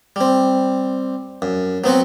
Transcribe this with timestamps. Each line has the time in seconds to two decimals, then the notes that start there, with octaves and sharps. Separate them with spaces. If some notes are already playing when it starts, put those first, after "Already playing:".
0.16 G3 C4
1.42 F#2
1.84 F#3 B3 C4 F#4